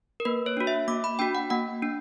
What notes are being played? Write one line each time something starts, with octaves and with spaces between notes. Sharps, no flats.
A#4
A#3 B4
C#5
D4 F#4
E5
A#3 D6
B5
D4 F#4 G5
F#5
A#3 F#5
D4